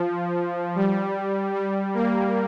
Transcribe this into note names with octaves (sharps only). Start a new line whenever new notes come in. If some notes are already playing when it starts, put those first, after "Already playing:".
Already playing: F3
G3
G3
A#3